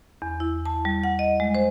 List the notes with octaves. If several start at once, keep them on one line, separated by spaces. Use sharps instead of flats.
E2
E4
A5
G3
F#5
D#5
G#3
C5